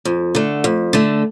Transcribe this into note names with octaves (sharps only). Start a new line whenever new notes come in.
F2
D3 A3
F2
D3 A3